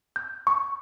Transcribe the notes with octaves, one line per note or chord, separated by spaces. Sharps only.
G6
C#6